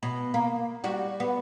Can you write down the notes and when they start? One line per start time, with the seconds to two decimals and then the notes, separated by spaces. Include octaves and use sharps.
0.03 B2
0.34 A#3
0.84 G3 F#4
1.20 B3